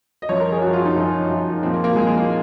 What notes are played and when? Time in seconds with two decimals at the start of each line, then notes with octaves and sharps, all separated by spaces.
0.22 D#5
0.29 F#2 F3 C#5
0.40 A#4
0.52 G#4
0.62 F#2 F#4
0.67 F3
0.73 F4
0.85 D#4
0.96 F#2 F3
1.29 F#2 F3
1.63 A#2 F3 C4
1.73 A#3
1.84 A#3
1.96 A#2 F3 G#3
2.07 G#3
2.17 A#3